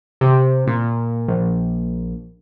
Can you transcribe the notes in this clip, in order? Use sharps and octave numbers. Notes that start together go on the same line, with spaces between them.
C3
A#2
A#1